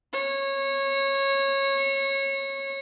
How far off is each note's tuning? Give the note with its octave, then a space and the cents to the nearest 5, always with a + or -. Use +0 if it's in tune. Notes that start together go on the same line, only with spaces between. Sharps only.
C#5 -20